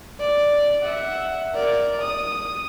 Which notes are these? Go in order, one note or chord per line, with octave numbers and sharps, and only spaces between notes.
D5
E5 F#5
A#4 D5
D#6